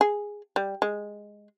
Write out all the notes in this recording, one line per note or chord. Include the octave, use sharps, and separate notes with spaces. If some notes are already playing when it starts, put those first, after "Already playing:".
G#4
G3
G#3